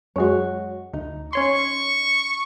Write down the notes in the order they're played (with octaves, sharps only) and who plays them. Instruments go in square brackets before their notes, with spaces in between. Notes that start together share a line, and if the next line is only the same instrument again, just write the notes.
[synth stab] F#2 G#3 [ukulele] F#4 C#5
[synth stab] D2 [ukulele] D#4
[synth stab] C#4 C#5 C6 [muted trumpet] C#6